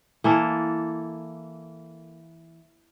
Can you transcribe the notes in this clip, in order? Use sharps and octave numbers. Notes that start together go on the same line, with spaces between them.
E3 A#3 A4